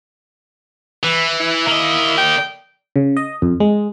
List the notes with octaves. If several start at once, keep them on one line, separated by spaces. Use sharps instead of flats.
E3 B4
E4
A#3 D#5
G5
C#3
D#5
F2
G#3